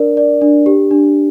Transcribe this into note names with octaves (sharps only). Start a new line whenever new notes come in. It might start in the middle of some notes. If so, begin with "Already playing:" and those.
Already playing: D4 A#4 D5
D5
D4
G4
D4